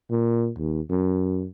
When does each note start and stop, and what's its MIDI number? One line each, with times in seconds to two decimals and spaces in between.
0.11 0.50 46
0.59 0.81 39
0.90 1.46 42